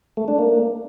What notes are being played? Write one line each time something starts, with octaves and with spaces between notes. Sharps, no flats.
A3
D4
A#3